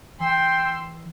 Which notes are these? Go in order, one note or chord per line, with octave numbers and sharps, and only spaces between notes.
E3 G5 C6 E6